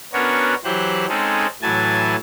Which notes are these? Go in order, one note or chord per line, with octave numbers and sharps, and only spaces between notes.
B3 C#4 D4 F#4 A#4 C#5
E3 F#3 G4 C5 F#6
G#3 C4 C#4 D#4 G#4 A4
A2 E3 F#3 G#5 A5 A6